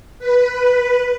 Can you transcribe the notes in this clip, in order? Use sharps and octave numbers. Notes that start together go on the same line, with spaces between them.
B4